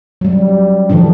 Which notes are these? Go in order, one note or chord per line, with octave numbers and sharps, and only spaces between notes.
F#3 G3
D3 E3 F3 D4